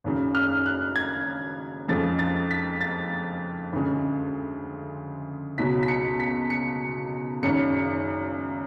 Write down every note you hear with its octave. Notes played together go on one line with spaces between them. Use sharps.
G#1 F#2 C#3
F6
F#6
G#6
F2 C#3 F3 G#3 A6
A6
B6
A6
D2 C#3 G#3
C#2 B2 F#3 B6
B6
C#7
B6
C#7
G#1 F#2 C#3 C#7